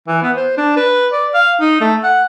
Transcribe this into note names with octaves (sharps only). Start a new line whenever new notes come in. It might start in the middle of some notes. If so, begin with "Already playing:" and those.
E3
B3
C5
D4
B4
D5
F5
D#4
A3
F#5